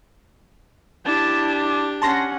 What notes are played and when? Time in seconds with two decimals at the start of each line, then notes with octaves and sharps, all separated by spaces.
1.05 D4 E4 G4 A5
2.02 C#4 F#5 A5 C6 A#6